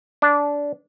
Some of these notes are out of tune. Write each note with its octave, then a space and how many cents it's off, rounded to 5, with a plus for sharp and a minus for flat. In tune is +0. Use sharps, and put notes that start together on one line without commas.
D4 -15